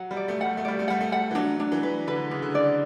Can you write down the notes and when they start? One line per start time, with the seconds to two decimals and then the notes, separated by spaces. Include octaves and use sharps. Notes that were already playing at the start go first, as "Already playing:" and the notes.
Already playing: F#3 F#5
0.11 G3
0.17 D5
0.28 A3
0.41 G3 F#5
0.57 A3
0.65 G3 D5
0.79 A3
0.88 G3 F#5
1.01 A3
1.12 G3 F#5
1.31 E3
1.35 F#3 D4
1.60 D4
1.72 E3
1.83 B4
2.07 D3 B4
2.31 C#3 D4
2.42 D3
2.55 D5